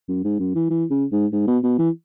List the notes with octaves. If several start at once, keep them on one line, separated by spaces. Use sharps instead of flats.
F#2
G#2
F#2
E3
E3
C#3
G#2
G#2
B2
B2
E3